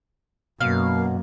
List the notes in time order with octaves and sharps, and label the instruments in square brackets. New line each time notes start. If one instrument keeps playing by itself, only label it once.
[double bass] F#2 [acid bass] B2 [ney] A#3 [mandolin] F5